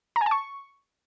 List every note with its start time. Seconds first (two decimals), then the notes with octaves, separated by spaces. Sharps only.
0.16 A#5
0.21 G#5
0.26 A5
0.31 C#6